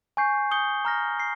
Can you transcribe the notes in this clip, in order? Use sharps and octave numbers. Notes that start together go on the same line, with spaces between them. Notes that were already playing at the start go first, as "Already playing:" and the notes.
G#5 C#6 G6 C7
D#6 G6 C#7 G7
A#5 F6 A#6
C7